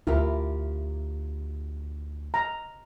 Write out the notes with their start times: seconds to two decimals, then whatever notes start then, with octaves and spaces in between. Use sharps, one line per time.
0.07 D2 E4 F4 G4 A#4
2.34 A#5